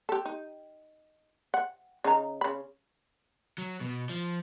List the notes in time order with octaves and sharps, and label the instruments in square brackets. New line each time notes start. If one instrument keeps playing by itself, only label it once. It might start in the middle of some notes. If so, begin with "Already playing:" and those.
[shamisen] G4 A4
D#4
F#5
C#3 D#4 A#5
C#3 B5
[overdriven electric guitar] F#3
B2
F3